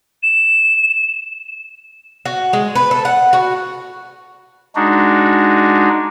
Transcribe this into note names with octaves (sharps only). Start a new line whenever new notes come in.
E7
F#4
G#3
B4
A4
F#5
F#4
G#3 D4 D#4 F#4